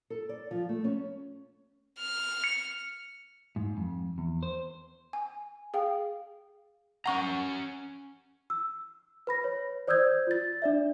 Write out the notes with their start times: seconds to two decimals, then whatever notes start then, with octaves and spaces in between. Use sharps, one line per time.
0.10 A4
0.29 D5
0.51 F3
0.69 A3
0.84 C#4
1.99 F6
2.44 C#7
3.56 G#2
3.77 F2
4.18 E2
4.43 C5
5.13 G#5
5.74 G#4 F5 G5
7.06 C#4 F#5 A#5 C#6
8.50 E6
9.27 B4 B5 A#6
9.44 C#5
9.87 C5 D5 D#6 E6 G6 G#6
10.27 F4 A6
10.62 D4 D5 E5